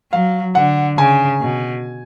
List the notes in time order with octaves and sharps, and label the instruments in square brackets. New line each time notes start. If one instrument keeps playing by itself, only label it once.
[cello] F#3 [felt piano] F5
[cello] D3 [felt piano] F#5
[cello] C#3 [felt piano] G#5
[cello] B2